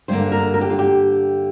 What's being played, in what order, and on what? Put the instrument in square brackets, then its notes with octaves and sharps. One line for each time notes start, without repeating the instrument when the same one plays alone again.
[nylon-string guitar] G2 D3 A#3 C5
A#4
A#4
G4
F4
G4